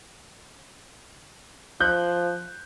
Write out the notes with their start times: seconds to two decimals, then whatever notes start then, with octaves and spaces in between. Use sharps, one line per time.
1.81 F3 F#6 G6